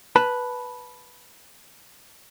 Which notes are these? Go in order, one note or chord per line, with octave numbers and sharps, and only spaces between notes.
B4 A5 B5